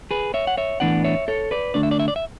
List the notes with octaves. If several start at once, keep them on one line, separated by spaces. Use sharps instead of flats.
G#4 B4
C#5 E5
F#5
C#5 E5
A2 E3 B3 D4 D5 F#5
C#5 E5
A4 C#5
B4 D5
D3 A3 D4 D5
E5
D5
E5
D5
E5